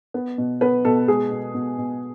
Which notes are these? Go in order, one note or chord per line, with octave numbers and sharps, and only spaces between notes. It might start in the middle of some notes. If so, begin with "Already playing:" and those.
B3
B2
B3 B4
B2 A4
G#3 G#4
B2
B2
B2